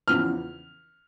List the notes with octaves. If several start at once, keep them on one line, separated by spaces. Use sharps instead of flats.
E2 C#3 F3 F6